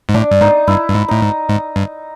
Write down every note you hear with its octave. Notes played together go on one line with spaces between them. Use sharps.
G#2
A2 D4
G2
G#2 D#4
G2 E4
G2
G#2
A2 D#4
G#2
G#2
G2